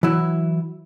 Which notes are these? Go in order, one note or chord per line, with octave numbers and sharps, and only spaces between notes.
E3 F#3 E4